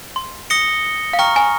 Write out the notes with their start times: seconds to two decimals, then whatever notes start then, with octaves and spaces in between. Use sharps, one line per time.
0.16 C6
0.50 D#6 A#6 C#7 G7
1.13 F5
1.19 G5 A#5 C#6 F6
1.36 G#5